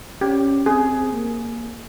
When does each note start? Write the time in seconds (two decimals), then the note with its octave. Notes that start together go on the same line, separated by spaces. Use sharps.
0.21 C#4 G4
0.66 C4 G#4
1.12 A#3